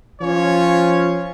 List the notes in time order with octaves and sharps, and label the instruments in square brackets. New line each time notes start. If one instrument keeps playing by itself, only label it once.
[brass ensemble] F3 C#4 F4 C#5